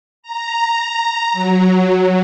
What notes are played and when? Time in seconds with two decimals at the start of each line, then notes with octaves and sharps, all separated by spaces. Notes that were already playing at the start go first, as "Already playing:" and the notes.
0.23 A#5
1.33 F#3